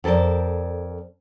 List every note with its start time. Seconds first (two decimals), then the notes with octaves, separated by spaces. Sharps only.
0.04 F2 A4 A#4 C5 D5